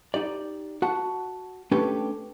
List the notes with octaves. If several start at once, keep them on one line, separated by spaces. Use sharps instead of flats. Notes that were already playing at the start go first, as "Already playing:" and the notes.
D#4 G4 D5
F#4 F#5 A5
A3 C#4 D4 G4 A4 B4